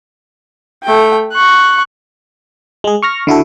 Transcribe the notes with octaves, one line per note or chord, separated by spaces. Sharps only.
A3 G5
C#6 F#6
G#3 G#4
C#6 F6 A#6
D3 E4 F#4 A4